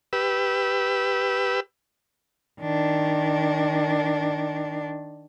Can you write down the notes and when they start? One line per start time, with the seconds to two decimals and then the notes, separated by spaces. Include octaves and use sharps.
0.13 G4 B4 E6
2.61 D#3 D4